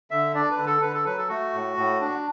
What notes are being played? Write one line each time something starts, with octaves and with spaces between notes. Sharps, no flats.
D3 E5
D4 D5
B4
D3
A4
D3 B4
A4
F#3 B4
A4
A3 F#4
A2
A2
D4